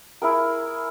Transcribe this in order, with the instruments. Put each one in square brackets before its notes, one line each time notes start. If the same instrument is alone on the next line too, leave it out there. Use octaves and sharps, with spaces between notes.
[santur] E4 G#4 A#4